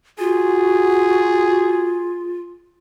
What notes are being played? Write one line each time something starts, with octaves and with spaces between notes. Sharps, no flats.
F4 F#4 G#4